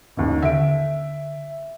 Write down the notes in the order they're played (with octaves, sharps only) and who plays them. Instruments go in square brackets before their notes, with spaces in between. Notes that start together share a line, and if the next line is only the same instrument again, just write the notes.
[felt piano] A1 D#2
[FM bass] D3 [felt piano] E5 D7